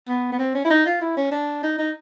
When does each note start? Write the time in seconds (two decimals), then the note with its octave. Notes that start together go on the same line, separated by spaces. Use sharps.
0.08 B3
0.32 B3
0.39 C4
0.55 C#4
0.65 E4
0.70 D#4
0.86 F4
1.01 E4
1.17 C#4
1.32 D4
1.63 D#4
1.78 D#4